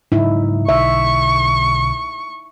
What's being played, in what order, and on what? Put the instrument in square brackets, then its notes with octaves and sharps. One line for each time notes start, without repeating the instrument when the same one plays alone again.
[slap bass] G#2 C#3 F#3 [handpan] D#4 E4
[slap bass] B1 D3 [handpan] E5 [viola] C#6